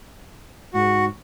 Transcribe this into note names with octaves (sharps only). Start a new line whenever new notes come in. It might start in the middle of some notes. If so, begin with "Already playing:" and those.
G#2 F#4